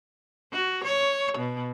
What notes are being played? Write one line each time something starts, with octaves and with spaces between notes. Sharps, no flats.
F#4
C#5
B2